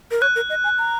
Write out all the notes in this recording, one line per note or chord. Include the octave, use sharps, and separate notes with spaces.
A#4
C#5 F#6
A#4
D#5
G#5
A#5